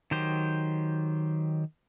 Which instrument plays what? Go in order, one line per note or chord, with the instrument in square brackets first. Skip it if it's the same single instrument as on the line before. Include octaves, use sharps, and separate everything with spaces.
[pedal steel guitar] D#3 F#3 G4 C5